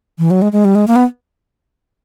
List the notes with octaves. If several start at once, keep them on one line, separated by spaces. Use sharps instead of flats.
E3
F#3
G#3
G#3
G3
G#3
A#3
B3